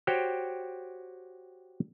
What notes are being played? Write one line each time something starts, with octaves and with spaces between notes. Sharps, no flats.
F#4 G4 C5 C#5 G5